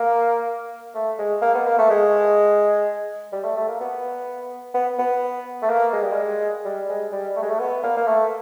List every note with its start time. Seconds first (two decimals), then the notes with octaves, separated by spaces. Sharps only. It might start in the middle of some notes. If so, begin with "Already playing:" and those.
Already playing: A#3
0.95 A3
1.19 G#3
1.42 A#3
1.55 B3
1.66 A#3
1.79 A3
1.90 G#3
3.33 G3
3.44 A3
3.57 A3
3.68 A#3
3.80 B3
4.75 B3
4.99 B3
5.62 A3
5.70 A#3
5.93 G#3
6.03 G3
6.12 G#3
6.65 G3
6.89 G#3
7.12 G3
7.36 A3
7.43 G#3
7.50 A3
7.60 B3
7.83 A#3
7.97 A#3
8.08 A3